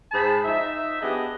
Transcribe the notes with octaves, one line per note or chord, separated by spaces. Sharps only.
G#2 G#4 C5 A5 B5
F3 D#4 E5
B3 D4 G4 G#4 D#5